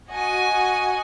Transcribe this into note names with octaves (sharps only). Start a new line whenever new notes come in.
F#4 D#5 G#5